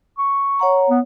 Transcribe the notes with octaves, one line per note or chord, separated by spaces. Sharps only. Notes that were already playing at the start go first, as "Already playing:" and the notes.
C#6
C#5 F#5 A#5
B3